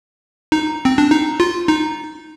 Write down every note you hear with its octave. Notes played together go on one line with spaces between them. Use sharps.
D#4
C4
D4
D#4
F4
D#4